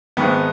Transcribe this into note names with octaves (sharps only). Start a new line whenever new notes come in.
G#1 G#2 D#3 B3